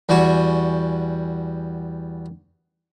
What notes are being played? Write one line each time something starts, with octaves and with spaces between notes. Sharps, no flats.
E2 G3 F#4 G#5 C#6